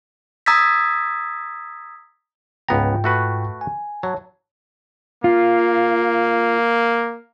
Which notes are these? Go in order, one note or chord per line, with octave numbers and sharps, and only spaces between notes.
A#5 D#6 E6 G#6 A6 B6
C#2 G#2 B3 F4 G5 A#5
A3 F#4 B4
G#5
F#3 C#5 A5
A#3 F4